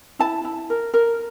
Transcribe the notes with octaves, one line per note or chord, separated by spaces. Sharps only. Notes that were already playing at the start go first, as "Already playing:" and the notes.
E4 A5
E4
A#4
A#4